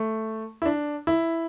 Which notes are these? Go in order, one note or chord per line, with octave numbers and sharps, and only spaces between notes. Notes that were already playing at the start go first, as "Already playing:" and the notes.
Already playing: A3
E4
D4
E4